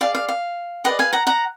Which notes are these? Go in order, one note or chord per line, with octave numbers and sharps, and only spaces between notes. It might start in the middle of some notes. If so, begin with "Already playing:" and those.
G#4 D5 F5
F5
F5
G#4 B4 D5 D#5 F#5
F5 G#5
F#5 A#5
F#5 A#5